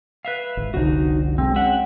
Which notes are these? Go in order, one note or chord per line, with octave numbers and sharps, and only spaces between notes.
B4 E5 F5
G#1
F1 C2 D3 D#4 F#4
B1 G#3 C4
G#3 C#4 E5 F#5 G5